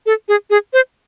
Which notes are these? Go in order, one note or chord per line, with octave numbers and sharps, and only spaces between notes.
A4
G#4
G#4
C5